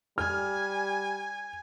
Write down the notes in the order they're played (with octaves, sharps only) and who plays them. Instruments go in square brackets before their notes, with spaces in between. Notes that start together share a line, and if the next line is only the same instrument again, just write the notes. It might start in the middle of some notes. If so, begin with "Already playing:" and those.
[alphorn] G3 [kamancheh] G#5 [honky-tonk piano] F6